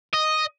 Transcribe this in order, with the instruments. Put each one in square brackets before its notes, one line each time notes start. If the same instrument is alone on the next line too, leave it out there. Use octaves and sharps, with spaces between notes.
[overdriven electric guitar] D#5